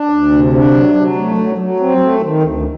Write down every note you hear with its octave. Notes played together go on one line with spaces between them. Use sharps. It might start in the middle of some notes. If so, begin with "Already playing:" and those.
Already playing: D4
D2
C3
D4
F#3
F#3
A3
F#3
F#3
C4
A3
D#3
D2